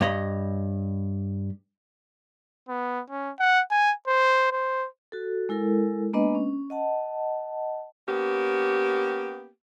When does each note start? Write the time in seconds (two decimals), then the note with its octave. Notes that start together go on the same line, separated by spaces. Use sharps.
0.01 G2 C#5 D#5 B5
2.69 B3
3.10 C#4
3.39 F#5
3.71 G#5
4.07 C5
4.52 C5
5.12 F#4 A4
5.49 G#3 E4 A4 A#4
6.13 G#3 A#3 B3 D4 B4 D#5
6.35 C#4
6.70 D#5 F#5 A5
8.08 A#3 B3 C#4 G4